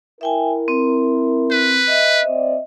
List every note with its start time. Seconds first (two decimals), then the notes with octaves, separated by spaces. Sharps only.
0.21 E4 A#4 E5 G5 G#5
0.68 C4
1.51 B4
1.87 D#5 E5
2.24 C4 D5